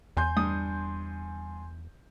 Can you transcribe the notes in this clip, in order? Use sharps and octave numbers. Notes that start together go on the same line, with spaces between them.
E2 G#5 C6 G6
G2 D#6